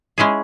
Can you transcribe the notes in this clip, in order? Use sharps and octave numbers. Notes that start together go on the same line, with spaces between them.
G#3 C#4 E4 G#4